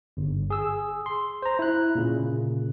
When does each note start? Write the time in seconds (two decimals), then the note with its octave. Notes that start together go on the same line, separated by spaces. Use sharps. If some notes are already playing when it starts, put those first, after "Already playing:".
0.17 G1
0.50 G#4 E6
1.06 C6
1.42 C5 A#5
1.59 E4 F#6
1.95 A#2 C#3